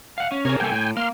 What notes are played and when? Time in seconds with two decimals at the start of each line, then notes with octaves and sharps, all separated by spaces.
0.18 F5 F#5
0.32 C#4
0.45 C3 G#4 A#4 C#5 G#6
0.60 C2 A#3 A4 G5 G#5
0.72 A2
0.97 A#3 C6 F6